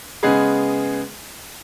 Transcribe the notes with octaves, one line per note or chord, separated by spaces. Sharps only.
C#3 G#3 B3 G#4 B4